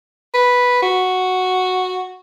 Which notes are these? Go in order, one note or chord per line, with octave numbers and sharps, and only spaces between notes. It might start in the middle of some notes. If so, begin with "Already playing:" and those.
B4
F#4